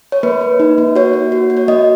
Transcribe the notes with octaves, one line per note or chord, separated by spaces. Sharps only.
C#5
A#3 B4
A#3
D#4
A#3
F#4 C#5
A#3
F#4
F#4
C#5
A#3 D#5